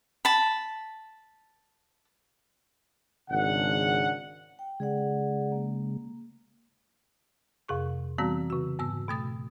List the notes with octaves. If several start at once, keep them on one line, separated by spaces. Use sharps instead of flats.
A5 B5
G#1 C#3 D4 F#5
G5
C#3 G#3 G#4 D5 F#5
A#3
F2 C3 G#4 C#6
E3 G3 B3 C4 F#4
C#3 F#4
G#2 B3 E6
B2 A3 D#6 A6